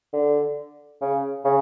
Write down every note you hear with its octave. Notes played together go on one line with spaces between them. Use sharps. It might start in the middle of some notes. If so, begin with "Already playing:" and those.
D3
C#3
C#3